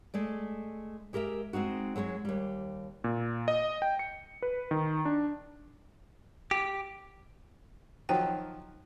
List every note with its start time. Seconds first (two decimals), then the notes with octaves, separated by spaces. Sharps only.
0.14 G#3 A3 D5
1.13 G#3 G4 A#4 D#5 E5
1.53 G#3 C4 D#4 F#4
1.96 F#3 G#3 C5 C#5
2.25 D#2 G3
3.04 A#2
3.48 D#5
3.82 G5
3.99 C#7
4.42 B4
4.71 D#3
5.05 D4
6.51 G4
8.09 D#3 F3 F#3 G5